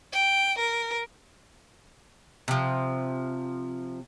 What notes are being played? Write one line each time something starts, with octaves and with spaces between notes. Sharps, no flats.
G5
A#4
C3 F3